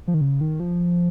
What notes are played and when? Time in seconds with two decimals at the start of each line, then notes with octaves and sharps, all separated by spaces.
0.08 F3
0.14 D#3
0.21 C#3
0.41 D#3
0.60 F3